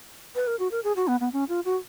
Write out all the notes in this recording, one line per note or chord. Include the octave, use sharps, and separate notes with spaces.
B4
A#4
F#4
A#4
G#4
F#4
B3
B3
C#4
F4
F#4